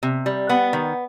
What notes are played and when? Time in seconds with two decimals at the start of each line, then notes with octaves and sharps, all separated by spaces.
0.03 C3
0.26 G3
0.49 B3 F#5
0.73 D#3